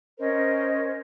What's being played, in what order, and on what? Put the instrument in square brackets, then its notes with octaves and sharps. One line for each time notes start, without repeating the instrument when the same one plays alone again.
[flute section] C#4 A#4 C5 D#5